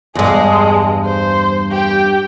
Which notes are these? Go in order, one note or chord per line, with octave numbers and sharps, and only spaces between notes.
E2 G2 G#3 G#4
C5
G4 G5